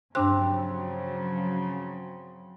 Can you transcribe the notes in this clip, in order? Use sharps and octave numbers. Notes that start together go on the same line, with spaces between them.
G2 C#3 F3 F#3 C4 D4 F#6